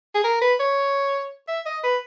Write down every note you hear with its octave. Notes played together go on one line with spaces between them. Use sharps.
G#4
A#4
B4
C#5
E5
D#5
B4